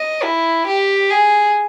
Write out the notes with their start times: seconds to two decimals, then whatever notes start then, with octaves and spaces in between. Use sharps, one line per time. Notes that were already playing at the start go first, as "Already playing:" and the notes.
Already playing: D#5
0.23 E4
0.67 G4
1.10 G#4